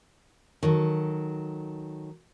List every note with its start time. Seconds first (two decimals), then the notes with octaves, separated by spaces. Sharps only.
0.63 D#3 F#3 A4